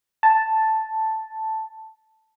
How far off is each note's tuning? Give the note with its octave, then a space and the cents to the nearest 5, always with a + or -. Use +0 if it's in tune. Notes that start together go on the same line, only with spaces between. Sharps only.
A5 +0